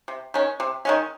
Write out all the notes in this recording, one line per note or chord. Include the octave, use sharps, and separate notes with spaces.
C3
D#3 G#3 C#4
C3
D#3 G#3 C#4